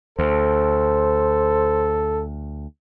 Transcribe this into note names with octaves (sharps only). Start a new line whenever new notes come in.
D2 A4 C5